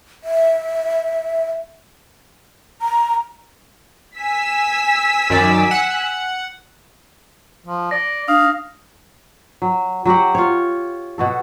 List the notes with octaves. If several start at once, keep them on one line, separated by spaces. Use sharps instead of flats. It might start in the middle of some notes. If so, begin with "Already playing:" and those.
E5
A#5
G#5 E6 B6
F#2 D#3 D5
F#5
F3
D5 A#6
D4 F5 D#6
F#3
F#3 F#4 G4 F#5
F4 C#5
B2 F#4 A4